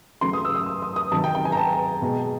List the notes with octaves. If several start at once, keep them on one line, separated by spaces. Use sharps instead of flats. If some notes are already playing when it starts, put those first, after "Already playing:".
C#3 F#3 A3 C6
D#6
E6
D#6
D#6
D#6
D#6
C3 D#3 F#3 A5
G5
G5
G#5
A#5
A5
B2 G#3